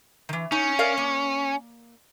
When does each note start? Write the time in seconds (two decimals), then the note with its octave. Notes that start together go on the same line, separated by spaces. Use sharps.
0.29 D#3 E3
0.52 C#4 D#4
0.79 A#4 D5 F5
0.97 A#3